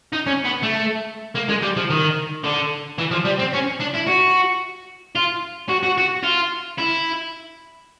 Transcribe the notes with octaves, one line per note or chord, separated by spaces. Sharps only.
D#4
C#4
B3
A3
A#3
G#3
G3
F3
D#3
D3
E3
F3
G3
C4
C#4
D4
E4
F#4
F4
F#4
F#4
F#4
F4
E4